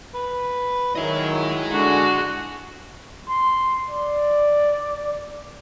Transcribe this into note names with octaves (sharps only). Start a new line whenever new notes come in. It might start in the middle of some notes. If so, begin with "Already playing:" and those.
B4
D#3 F#3 E4 G#4 D#5
D3 G#3 F#4
C6
D5